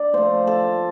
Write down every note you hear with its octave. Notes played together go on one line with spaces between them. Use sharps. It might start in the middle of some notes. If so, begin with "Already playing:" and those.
Already playing: D4 D5
A#2 F3 A3 C5
A4